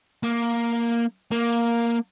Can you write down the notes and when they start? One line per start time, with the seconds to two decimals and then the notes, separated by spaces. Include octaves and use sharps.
0.23 A#3
1.31 A#3